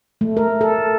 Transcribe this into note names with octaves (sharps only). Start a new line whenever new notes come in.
A3
A#4
A4